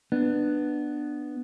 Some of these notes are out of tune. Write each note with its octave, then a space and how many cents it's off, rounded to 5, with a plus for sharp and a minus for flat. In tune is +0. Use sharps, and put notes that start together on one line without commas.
B3 +0 D4 +20